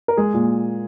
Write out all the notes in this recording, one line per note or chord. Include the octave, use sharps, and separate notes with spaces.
A#4
G#3 G#4
A#2